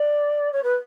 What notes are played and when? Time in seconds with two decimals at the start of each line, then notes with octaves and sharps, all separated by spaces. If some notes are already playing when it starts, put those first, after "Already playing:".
Already playing: D5
0.52 C#5
0.63 B4